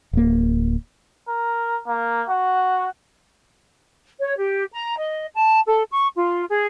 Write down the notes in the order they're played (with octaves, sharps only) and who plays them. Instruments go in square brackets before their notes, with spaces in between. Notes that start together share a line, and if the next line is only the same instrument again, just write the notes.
[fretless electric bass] D1 A#3
[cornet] A#4
A#3
F#4
[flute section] C#5
G4
A#5
D#5
A5
A4
C#6
F4
G#4